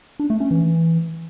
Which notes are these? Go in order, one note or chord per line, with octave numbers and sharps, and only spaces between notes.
D4
A3
C#4
E3